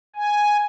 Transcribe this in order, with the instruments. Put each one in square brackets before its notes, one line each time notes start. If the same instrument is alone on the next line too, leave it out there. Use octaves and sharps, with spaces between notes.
[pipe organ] G#5